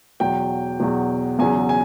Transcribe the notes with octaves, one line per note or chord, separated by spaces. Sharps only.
E2 B2 F#3 G5
E2 B2 F#3
E2 C#3 F#3 G#5
G#5